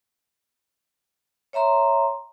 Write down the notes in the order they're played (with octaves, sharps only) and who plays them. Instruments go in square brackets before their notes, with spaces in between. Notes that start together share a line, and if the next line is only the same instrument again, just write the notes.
[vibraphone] C#5 E5 A#5 C6